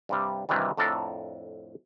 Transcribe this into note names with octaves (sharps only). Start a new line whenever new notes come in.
G2 C3 G3
G2 C3 D#3 E3 F#3 G3
F2 A2 D4 A4 A#4